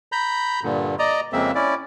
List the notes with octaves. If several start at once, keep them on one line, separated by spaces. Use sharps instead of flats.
A#5 B5 G6
G2 A#2 D3
D5 D#5 A#5
F2 C#3 G#3 A#3 C4 E5
C#4 E4 D5